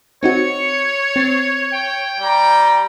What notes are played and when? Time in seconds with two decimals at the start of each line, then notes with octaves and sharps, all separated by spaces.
0.23 C4 D#4 F#4 C#5 C#7
1.16 C4 A6 C7
1.71 G5
2.20 G3 A#5